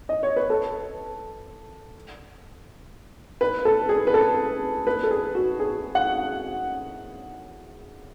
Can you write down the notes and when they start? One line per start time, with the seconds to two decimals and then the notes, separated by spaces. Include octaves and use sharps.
0.09 D#5
0.23 C#5
0.36 B4
0.50 A4
3.41 B4
3.65 A4
3.89 G#4
4.07 B4
4.14 A4
4.87 B4
5.04 A4
5.11 G#4
5.35 F#4
5.59 G#4
5.95 F#5